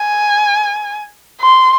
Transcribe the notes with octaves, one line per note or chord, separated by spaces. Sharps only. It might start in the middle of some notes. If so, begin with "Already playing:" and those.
Already playing: G#5
C6